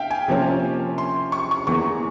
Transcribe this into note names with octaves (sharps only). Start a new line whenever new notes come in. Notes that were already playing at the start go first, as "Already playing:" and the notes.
Already playing: E5 F5 G5
G#5
C3 F3 A#3 C#4
C6
C#6
C#6
E2 E3 A#3 C#6